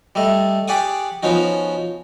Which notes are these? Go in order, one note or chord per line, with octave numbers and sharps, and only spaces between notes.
G3 A3 D#5
G4 G#4 D5 F#5 C#6 D#6
F3 B3 C#4 D#4 F#4